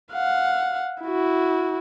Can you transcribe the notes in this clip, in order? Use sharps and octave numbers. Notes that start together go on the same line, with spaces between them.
F5 F#5
E4 F#4